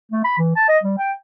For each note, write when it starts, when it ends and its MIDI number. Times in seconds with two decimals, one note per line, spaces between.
0.12 0.23 57
0.25 0.36 83
0.38 0.54 52
0.56 0.68 81
0.69 0.79 75
0.84 0.96 55
0.98 1.13 79